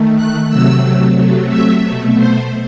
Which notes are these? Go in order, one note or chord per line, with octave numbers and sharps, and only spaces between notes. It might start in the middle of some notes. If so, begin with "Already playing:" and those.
Already playing: D#3 A3
F#6
C3 F#3 A3 E6
C3 F#3 A3
E5
B2 A3
C5